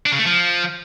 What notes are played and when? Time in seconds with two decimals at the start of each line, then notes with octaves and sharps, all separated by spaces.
0.06 D4
0.12 C#3
0.19 A3
0.25 F3